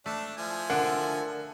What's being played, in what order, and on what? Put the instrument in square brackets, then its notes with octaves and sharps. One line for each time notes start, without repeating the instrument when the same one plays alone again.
[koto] A3 [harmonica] D4
[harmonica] F3 E4 G#5
[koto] D3 D4 [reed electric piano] A#4 [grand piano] F#5